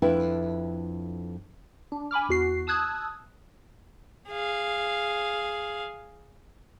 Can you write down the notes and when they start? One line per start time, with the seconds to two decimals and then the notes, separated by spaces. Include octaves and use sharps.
0.02 F2 D4 E4 B4 G5
1.92 D4
2.11 G#5 B5 D6 F6
2.29 E2 F#4 C7
2.67 A5 D#6 E6 F#6 G#6
4.29 G#4 F5